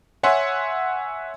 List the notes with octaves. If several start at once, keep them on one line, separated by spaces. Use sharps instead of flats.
C#5 E5 F#5 G#5 C6